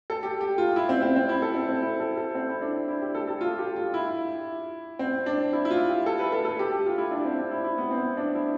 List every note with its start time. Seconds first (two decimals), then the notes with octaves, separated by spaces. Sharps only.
0.10 A4
0.23 G4
0.41 G4
0.58 F4
0.76 E4
0.89 C4
1.02 C4
1.16 C4
1.29 E4
1.42 A4
1.55 C4
1.69 C4
1.82 E4
2.00 A4
2.17 A4
2.35 C4
2.49 E4
2.61 D4
2.88 E4
3.02 G4
3.15 A4
3.28 A4
3.41 F4
3.51 F4
3.58 G4
3.76 F4
3.94 E4
4.99 C4
5.26 D4
5.53 E4
5.65 E4
5.70 F4
5.89 G4
6.06 A4
6.19 B4
6.32 A4
6.45 A4
6.59 G4
6.72 G4
6.86 F4
6.98 E4
7.11 D4
7.25 C4
7.38 D4
7.51 E4
7.64 E4
7.78 B3
7.91 C4
8.17 D4
8.35 E4